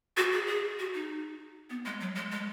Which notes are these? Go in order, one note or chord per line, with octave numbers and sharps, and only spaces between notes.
F#4
G#4
G#4
F#4
D#4
B3
G#3
F#3
G#3
G#3